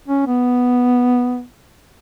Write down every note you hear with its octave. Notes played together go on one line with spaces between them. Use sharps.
C#4
B3